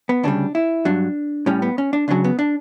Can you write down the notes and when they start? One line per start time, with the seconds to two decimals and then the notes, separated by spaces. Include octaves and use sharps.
0.09 B3
0.23 D2 C#3 G3 D4
0.55 E4
0.85 G2 F#3 D4
1.46 A2 G3 C#4
1.62 B3
1.78 C#4
1.93 D4
2.08 C#2 C#3 F#3 D4
2.24 B3
2.39 D4